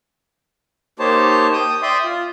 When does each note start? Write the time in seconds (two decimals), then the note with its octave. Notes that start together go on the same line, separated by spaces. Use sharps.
0.99 A#3 D#4 G4 C5 C#5 A5
1.53 G5 D#6
1.82 D5 E5 G5 C6 D#6
2.04 F4